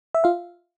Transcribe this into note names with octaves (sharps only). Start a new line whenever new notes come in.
E5
F4 F5